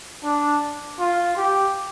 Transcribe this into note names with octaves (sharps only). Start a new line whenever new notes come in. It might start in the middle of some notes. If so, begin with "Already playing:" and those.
D4
F4
G4